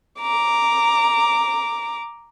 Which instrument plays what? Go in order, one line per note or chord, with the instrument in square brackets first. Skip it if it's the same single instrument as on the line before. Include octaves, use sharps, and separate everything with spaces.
[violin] A#5 D6